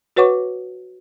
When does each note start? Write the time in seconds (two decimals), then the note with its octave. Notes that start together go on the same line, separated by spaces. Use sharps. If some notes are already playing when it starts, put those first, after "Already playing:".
0.16 F#4 B4 C#5 F#5 C#6 D6